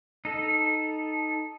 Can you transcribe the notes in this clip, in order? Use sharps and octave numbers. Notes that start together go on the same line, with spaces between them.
D#4 A4